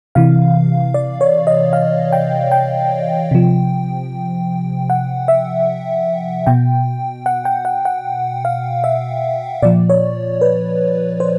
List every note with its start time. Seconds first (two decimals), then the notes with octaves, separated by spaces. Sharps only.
0.15 C3 E3 F5
0.94 D5
1.21 C#5
1.47 D#5
1.73 F5
2.13 G5
2.52 G5
3.31 C3 F3
4.90 F#5
5.28 E5
6.47 B2 G5
7.26 F#5
7.45 G5
7.65 F#5
7.85 F#5
8.45 F5
8.84 E5
9.62 A#2 F3 D5
9.90 C#5
10.41 B4
11.20 C5